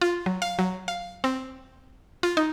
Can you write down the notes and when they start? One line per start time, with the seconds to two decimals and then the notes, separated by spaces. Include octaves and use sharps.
0.01 F4
0.26 F#3
0.42 F5
0.59 F#3
0.88 F5
1.24 C4
2.23 F4
2.37 D#4